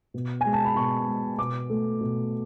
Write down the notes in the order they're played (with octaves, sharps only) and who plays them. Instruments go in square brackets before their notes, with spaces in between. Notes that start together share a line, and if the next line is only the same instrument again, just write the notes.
[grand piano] B2
G#3 G#5
A5
B5
B2 C#6
G#3
B2 D6
A3
B2